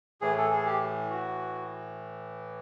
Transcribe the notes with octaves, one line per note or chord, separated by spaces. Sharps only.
A2 E3 G#4
A4
G#4
G4
F#4